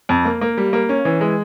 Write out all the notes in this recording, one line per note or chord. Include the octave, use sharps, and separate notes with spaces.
F2
A#3
A#3
G3
A#3
C#4
E3
G#3